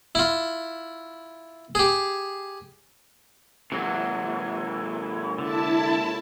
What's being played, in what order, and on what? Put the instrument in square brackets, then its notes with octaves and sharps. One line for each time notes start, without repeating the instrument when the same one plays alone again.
[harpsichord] E4 F4
G4 G#4
[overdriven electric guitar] G#2 C3 [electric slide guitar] E3 F#3
[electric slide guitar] D3 [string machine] E4 A5